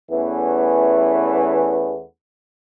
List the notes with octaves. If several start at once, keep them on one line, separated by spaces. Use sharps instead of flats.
E2 E3 A3 B3 C#4